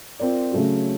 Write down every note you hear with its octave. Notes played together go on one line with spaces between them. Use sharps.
C4 F4 A#4 D5
C#3 F#3 A3 C#4 F#4